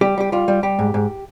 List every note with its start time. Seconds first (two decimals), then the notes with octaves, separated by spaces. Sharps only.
0.01 G3 G4
0.18 G3 G4
0.32 G3 F4
0.48 G3
0.63 G3 G4
0.79 G#2
0.94 G#2